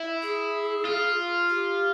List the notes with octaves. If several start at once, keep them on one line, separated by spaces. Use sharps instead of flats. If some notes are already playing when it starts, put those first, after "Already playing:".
Already playing: E4
G#4
F4
G4